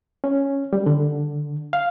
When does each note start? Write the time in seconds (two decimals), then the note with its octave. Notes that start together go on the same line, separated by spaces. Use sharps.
0.24 C#4
0.73 G3
0.86 D3
1.73 F5